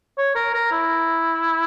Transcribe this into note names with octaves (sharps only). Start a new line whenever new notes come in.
C#5
A#4
A#4
E4